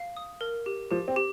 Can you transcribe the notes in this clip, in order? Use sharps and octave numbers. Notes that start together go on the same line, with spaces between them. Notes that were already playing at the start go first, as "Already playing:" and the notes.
Already playing: F5
D#6
A#4
G4
F3 G4
C4
G4